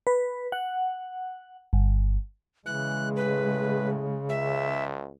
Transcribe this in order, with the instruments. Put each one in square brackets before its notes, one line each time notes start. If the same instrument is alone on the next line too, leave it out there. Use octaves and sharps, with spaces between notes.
[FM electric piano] B4
F#5
G1
[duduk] C#3 [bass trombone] E3 [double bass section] G#3 [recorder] F#6
[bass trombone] A2 [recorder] B4
[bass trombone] C#2 [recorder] E5